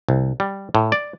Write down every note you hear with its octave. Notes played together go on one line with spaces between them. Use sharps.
C2
G3
A2
D5